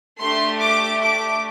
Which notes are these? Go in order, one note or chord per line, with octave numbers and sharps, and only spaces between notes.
A3 D4 G4 C6
D6
D6